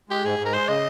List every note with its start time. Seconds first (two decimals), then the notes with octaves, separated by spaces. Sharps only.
0.09 G#3 G4
0.25 G#2 G#4
0.39 G#2
0.45 A#4
0.53 G#3 C5
0.68 C#3 D#5